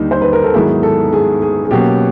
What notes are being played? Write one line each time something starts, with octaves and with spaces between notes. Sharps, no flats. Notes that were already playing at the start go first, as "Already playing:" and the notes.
Already playing: D#2 D3 G3 A#3 D#4
C5
B4
A#4
A4
G#2 D#3 F#3 B3 E4 G#4
A4
G#4
G#4
G#4
B2 F#3 A#3 C#4 G4